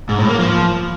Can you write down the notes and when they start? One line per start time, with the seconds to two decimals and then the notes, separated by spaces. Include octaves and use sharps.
0.09 G#2
0.19 A2
0.29 A#3
0.39 F3